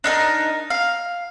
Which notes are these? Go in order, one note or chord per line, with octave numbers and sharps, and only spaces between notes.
D4 D#4 A#4
F5